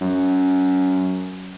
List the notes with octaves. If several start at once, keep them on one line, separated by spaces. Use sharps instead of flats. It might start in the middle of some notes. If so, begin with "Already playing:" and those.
F#2